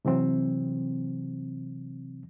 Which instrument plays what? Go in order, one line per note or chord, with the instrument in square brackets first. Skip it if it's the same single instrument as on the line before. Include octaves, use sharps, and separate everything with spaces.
[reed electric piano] C3 E3 F#3 C4